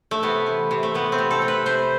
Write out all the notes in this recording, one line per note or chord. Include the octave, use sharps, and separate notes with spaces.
A3
C3 B3
E3
C3
A3
C3 B3
C4
C3
A4
C3
B4
C3 C5